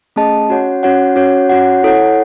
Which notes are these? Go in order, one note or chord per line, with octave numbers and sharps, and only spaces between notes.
A3 C#4 G#4 D#5 A5
C#4 F#4 C#5 F#5
C#4 F#4 C#5 F#5
C#4 F#4 C#5 F#5
C#4 F#4 C#5 F#5
E4 A4 C#5 F#5